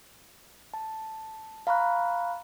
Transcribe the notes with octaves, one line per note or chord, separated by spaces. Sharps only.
A5
F5 A#5 B5 C#6 F#6